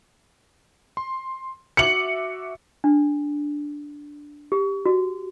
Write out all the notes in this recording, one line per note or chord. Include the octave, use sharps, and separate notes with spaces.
C6
F#4 E5 D6 C#7 F#7
D4
G4
F#4